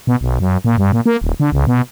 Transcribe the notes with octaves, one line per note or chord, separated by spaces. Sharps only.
B2
B1
F#2
A#2
G2
A#2
A#3
D#1
D3
C#2
B2